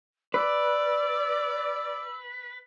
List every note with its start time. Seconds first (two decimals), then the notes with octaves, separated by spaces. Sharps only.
0.34 B4 D5 E6